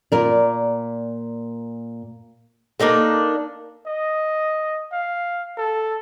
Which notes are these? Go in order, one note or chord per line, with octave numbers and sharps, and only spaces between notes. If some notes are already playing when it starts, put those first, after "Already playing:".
A#2 A#4 D5
A#3 D4 D#4 A4
D#5
F5
A4